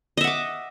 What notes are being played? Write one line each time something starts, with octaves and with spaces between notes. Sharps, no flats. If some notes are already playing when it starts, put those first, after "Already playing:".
D#5 E5 F#5 D6